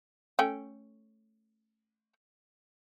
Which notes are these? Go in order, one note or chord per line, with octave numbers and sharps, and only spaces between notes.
A3 C#4 G5